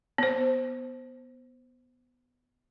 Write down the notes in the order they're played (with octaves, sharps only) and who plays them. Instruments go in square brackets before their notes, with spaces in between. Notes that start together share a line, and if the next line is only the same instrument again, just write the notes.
[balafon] B3 C5